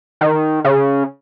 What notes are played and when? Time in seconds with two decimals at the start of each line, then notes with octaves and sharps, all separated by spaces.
0.21 D#3
0.64 C#3